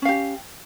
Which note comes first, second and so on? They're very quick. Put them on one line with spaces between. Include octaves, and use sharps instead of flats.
C#4 F5 G4